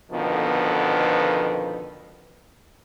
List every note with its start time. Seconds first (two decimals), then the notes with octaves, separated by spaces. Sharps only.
0.12 F2 B2 D3 D#3 F3 B3